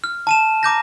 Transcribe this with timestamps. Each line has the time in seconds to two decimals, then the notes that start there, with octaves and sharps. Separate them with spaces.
0.04 F6
0.27 A5 D#7 E7
0.63 A#5 D6 G6 A#6